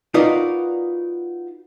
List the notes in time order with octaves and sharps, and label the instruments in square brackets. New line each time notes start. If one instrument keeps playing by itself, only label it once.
[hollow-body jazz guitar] D#4 F4 F#4 A#4 B4 D5